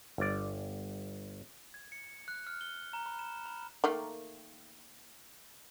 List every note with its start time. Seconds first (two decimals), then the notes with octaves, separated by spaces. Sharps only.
0.18 G1 D5
1.74 G#6
1.92 C#7
2.28 F#6
2.47 F6
2.61 G7
2.93 A#5
3.06 B5
3.19 E7
3.46 B5
3.84 D#3 A3 A#3